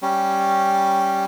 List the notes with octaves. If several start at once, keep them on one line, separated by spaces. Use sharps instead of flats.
G3 C#4